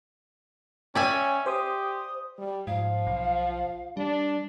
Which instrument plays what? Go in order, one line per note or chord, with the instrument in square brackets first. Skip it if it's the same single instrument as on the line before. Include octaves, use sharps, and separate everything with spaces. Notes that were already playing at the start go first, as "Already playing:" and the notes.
[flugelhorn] C#4 [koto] D5 E5 G#5 [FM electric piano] G5
[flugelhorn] G4 [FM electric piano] C5 C6 D#6
[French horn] G3
[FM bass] G#2 [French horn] F3 [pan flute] F5
[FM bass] B1
[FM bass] G3 [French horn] D4